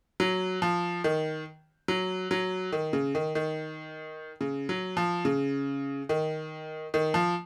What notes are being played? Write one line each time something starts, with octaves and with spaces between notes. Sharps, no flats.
F#3
F3
D#3
F#3
F#3
D#3
C#3
D#3
D#3
C#3
F#3
F3
C#3
D#3
D#3
F3